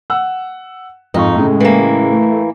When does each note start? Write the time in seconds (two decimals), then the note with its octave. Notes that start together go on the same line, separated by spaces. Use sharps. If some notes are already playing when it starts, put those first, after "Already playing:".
0.10 F#5 E6
1.14 F2 G#2 D#4 F4 C#6
1.35 A2 C#3 G#3
1.60 E3 A#3
2.13 A3